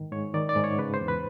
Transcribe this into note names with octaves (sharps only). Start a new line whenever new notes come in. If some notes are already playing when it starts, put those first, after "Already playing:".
Already playing: G#2 D#3
G#2 C#5
D#3 D5
D5
G#2
C#5
C#3 B4
C5
E2
B4